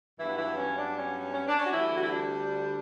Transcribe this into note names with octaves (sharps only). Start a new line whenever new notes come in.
G2 E3 F#3 B3 E4
E3 E4
C#4
D4
C#4
C#4
D4
C#4
F#4
D2 D3 E3 G3 E4
F#4
E4
D4